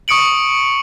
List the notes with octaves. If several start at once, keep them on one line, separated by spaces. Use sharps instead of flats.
C#6 D#6 C#7 D7 F#7